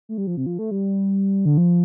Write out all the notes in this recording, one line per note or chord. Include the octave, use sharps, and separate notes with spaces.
A3
G3
F3
C3
F3
A3
G3
D3
F3